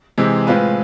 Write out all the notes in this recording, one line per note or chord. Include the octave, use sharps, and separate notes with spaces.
C3 E3 G#3 C4
A2 G#3 C4 F4 B4